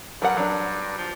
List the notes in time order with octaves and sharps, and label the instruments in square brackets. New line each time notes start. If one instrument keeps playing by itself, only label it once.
[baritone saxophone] G2 [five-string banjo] F#3 A#4 F#5
[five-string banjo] F#3 D4
[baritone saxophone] F3